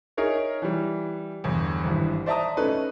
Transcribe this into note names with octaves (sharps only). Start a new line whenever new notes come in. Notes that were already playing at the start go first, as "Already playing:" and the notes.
D#4 G#4 A#4 C#5 E5
E3 G3
G1 E2
G#1 G2 E3
C5 D5 E5 A5 A#5 D#6
A3 C#4 D#4 A4 B4